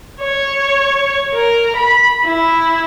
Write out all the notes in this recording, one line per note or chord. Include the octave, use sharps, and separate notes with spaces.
C#5
A#4
B5
E4